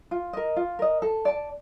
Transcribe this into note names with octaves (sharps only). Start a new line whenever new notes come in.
F4
A#4 D#5
F4
A#4 D#5
A4
D5 A5